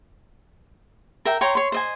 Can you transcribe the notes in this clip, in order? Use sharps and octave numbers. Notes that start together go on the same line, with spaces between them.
A#4 E5 G5
C#5 G5 A#5 C6
C#5 C6
C5 D#5 G#5